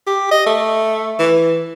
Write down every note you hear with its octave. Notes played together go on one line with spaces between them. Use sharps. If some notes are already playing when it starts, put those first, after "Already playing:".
G4
D#5
A3
E3